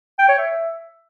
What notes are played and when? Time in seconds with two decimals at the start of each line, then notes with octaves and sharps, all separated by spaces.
0.19 G5
0.28 C#5
0.38 E5